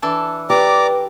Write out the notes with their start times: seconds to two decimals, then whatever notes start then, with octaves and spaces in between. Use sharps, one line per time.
0.02 E3 D4 A4
0.50 G4 B4 D5 A#5 D6